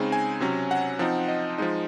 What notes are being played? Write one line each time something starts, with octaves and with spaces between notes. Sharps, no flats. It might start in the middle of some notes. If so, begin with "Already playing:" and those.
Already playing: C#3 G#3 C4 D#4
G#5
C3 F#3 C#4
F#5
F3 C4 D#4
D#5
F3 G#3 D#4